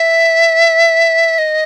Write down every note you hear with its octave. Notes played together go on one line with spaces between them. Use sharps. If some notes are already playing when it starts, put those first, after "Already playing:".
Already playing: E5
D#5